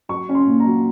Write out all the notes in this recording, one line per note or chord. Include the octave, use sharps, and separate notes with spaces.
F#3 C#6
C#4
C6
A#2
A#5
F#3